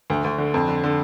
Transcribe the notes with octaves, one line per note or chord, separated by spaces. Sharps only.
D2
D2
D3
F2
D3
D3